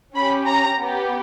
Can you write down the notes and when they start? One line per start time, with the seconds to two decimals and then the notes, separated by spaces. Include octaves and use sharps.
0.15 C#4 G4 B5
0.47 A#5
0.79 B3 G4